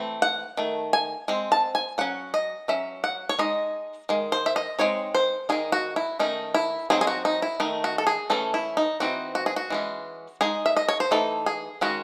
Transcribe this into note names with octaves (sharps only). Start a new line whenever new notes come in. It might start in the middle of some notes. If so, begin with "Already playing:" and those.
Already playing: E3 A3 C4
F#5
D#3 A3
G#5
G#3 C4
A5
G#5
F#3 C#4 F#5
D#5
F#3 C#4 E5
F#5
C#5
G#3 D#4 D#5
D#3 G#3
C5
E5
D#5
G#3 C4 D#4 C#5
C5
D#3 G#3 D#4 G#4
F#4
E4
D#3 A3 C#4 D#4
E4
F#3 C4 D#4 G#4
G#4
F#4
D#4
E4
D#3 A3 D#4
F#4
A4
G#4
E3 A3 C#4 A4
E4
D#4
E3 C4 D#4 F#4
F#4
G#4
F#4
E3 G#3 C#4
G#3 D#4 G#4
E5
D#5
C#5
C5
E3 A3 D#4 A4
G#4
D#3 G#3 C#4 F#4